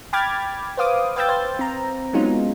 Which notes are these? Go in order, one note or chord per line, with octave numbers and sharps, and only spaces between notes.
G5 B5 D6 F6 G#6 A6
B4 C5 F5 D6 D#6
B4 F5 G5 E6 G6 A6
C5 G6
C4 A#5
F#3 G#3 B3 C#4 D#4 F4